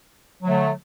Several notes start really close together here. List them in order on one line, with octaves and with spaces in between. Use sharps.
F#3 D3 A3